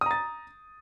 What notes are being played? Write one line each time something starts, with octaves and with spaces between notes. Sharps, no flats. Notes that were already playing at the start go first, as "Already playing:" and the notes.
A#5 D#6 A6